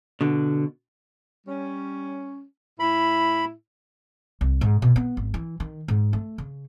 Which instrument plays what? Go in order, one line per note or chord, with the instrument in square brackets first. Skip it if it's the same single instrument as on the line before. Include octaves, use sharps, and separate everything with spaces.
[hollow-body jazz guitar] B2 D3
[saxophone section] G3 C#4
[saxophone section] A2 E4 [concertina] B5
[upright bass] C2
G#2
B2
B3
G#1
E3
D#3
G#2
A3
C#3